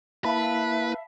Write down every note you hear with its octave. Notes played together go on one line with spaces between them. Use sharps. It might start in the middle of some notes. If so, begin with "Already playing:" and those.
A#3 E4 B4 E5 F5 A5 B5